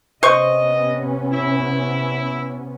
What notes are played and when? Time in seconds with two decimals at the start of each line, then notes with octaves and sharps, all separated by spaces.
0.23 C3 B3 C#4 C5 D#5 C#6
1.32 E4